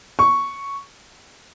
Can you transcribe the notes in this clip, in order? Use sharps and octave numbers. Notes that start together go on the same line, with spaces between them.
C#6